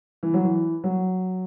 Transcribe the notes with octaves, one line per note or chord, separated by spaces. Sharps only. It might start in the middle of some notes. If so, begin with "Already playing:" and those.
E3
F#3
E3
F#3